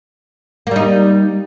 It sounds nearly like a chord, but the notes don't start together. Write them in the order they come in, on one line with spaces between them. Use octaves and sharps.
A#3 G3 D#4